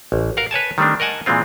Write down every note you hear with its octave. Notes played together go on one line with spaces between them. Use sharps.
A1
A#4 F5 F#5
B4 C#5 G#5 A5
D#3 G3 A3 C4 D4
A#4 D#5 F#5 G#5 A5
A#2 E3 G#3 C4 F4